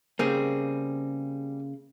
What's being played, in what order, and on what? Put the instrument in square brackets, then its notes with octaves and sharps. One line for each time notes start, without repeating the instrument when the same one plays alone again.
[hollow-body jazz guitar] C#3 A#3 [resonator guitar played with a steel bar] G3 C4 G#4